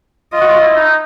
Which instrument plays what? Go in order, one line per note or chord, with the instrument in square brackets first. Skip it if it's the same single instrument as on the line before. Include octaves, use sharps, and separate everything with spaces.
[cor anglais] F4 [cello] D#5
[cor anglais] F#4
F4
E4
D#4